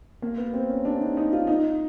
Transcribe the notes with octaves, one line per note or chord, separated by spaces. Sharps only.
A#3
B3
C4
C#4
D4
D#4
D#4
F4
D#4